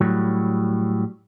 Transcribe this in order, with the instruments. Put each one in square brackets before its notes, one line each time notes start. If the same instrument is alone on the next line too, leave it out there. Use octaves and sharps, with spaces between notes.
[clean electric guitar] A2 F#3 G3